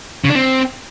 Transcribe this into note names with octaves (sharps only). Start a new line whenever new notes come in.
C#3
D4
C4